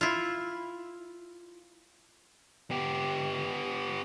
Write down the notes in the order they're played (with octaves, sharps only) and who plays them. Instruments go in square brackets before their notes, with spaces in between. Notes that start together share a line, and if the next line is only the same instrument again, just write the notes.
[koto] E4 F4
[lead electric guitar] B3 G4